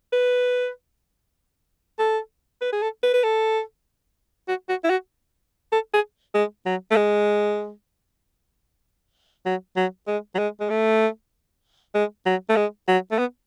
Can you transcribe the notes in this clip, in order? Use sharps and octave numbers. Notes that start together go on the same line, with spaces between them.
B4
A4
B4
G#4
A4
B4
B4
A4
F#4
F#4
E4
F#4
A4
G#4
G#3
F#3
A3
G#3
F#3
F#3
G#3
F#3
G#3
G#3
A3
G#3
F#3
A3
G#3
F#3
A3
B3